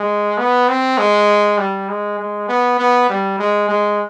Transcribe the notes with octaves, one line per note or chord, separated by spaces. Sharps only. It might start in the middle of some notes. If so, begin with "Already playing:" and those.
Already playing: G#3
B3
C4
G#3
G3
G#3
G#3
B3
B3
G3
G#3
G#3